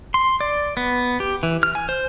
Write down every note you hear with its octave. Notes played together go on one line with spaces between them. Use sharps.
C6
D5
B3
G4
E3
F6
G#5
C5